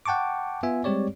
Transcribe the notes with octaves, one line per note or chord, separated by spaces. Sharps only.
F#5 G5 A5 C#6 D6
B3 F4 E5 G#5
G3 G#3 C4 G4 C#5 D5